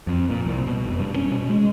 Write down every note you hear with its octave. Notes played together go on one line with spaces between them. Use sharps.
F2
A#2
C2
B2
F1
G2
C#4
B2
G#3